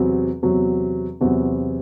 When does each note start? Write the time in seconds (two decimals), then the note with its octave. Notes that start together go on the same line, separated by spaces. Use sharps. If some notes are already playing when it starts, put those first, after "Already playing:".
Already playing: E2 C3 F#3 C4 F#4
0.43 E2 C3 F#3 C4 F#4
1.21 E2 C3 F#3 C4 F#4